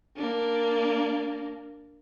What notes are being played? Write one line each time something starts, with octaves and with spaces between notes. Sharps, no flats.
A#3 D4